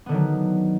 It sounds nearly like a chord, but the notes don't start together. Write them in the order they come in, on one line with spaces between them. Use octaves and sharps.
B3 D3 D#3 F#3